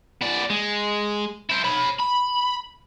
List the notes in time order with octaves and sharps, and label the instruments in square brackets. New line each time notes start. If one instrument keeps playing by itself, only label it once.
[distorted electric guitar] B3 D5
G#3
E4 C5
C#5 B5
B5